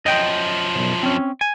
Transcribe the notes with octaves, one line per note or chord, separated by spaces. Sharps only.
F#2 F3 D#5 G5
B1 C3
C4 C#4
G#5